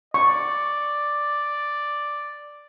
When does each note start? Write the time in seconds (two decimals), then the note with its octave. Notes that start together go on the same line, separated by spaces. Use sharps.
0.14 D5 C#6